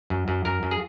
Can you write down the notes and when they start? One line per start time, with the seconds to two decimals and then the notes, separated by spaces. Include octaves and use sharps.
0.10 F#2
0.28 F#2
0.45 F#2 A#4
0.63 F#2
0.71 G#4